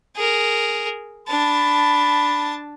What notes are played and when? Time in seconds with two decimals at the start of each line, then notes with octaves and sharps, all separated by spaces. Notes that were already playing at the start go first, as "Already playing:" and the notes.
0.16 G#4 A#4
1.28 D4 A5 B5